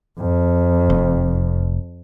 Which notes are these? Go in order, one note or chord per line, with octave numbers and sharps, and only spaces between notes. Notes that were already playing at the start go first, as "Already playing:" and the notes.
F2
F1